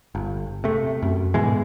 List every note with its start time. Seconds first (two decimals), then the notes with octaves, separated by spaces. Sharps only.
0.15 G1
0.64 C3 A3
1.02 F#2
1.34 G#2 B2 E3 G#3